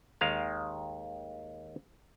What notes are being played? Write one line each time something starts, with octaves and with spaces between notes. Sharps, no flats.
D#2 D#3 G#3 F5